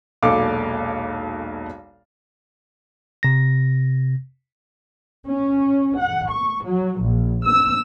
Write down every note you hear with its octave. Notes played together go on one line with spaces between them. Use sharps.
E1 B1 A#2 A4 F5 D6
C3 A#6
C#4
F#5
C#6
F#3
A#1
E6